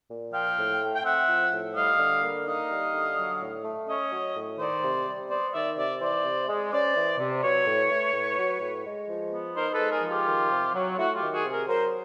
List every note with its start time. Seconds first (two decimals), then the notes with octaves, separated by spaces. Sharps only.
0.09 A#2
0.33 F3 F5 G5
0.57 A2
0.81 A3
0.95 G5
1.04 C4 E5 F#5
1.28 F3
1.52 A2
1.75 G3 D#5 F5
1.99 D3
2.22 A#3
2.46 D#4 D#5 F5
2.70 G3
2.93 D3
3.17 F#3
3.41 A2
3.64 A3
3.88 C#4 C#5 D#5
4.11 F#3
4.35 A2
4.59 D#3 C5 D5
4.82 C3
5.06 G3
5.30 B3 C5 D5
5.54 D#3 D5 E5
5.77 C3 D5 E5
6.00 E3 C5 D5
6.24 C3
6.48 G#3
6.72 C#4 C5 D5
6.95 E3
7.19 C3
7.43 F#3 B4 C#5
7.67 A2
7.90 A3
8.13 A2
8.37 F#3
8.60 A2
8.85 G#3
9.08 F3
9.32 B3
9.55 D#4 A#4 C5
9.73 A4 B4
9.80 G#3
9.91 G#4 A#4
10.03 F3
10.09 F4 G4
10.27 D#3
10.50 C3
10.74 F#3
10.97 A3 E4 F#4
11.15 F4 G4
11.21 D#3
11.33 F#4 G#4
11.45 C3
11.50 G#4 A#4
11.68 F#3 A#4 C5